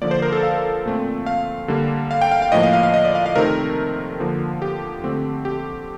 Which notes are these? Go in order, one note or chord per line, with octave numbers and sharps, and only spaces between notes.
D3 F3 A#3 D5
C5
A#4
A4
F5
A#2 A3 C4
F5
D3 G3 A#3
F5
G5
F5
F5
A2 F3 A#3 D#5
F5
F5
F5
D#5
D5
F5
F5
C3 D#3 A3 C4 A#4
D3 F3 A#3
G4
D3 A3 C4
G4